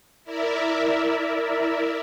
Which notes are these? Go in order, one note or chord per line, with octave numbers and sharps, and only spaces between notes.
E4 A#4 D5 E5